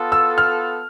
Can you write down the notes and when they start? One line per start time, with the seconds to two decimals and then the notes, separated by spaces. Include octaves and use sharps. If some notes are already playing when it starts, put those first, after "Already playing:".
Already playing: B3 F4 A4
0.12 E6
0.38 F6